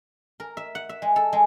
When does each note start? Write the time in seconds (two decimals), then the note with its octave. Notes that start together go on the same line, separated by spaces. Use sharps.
0.40 A#4
0.57 E5
0.75 F#5
0.89 E5
1.02 G#3
1.16 A4
1.33 G#3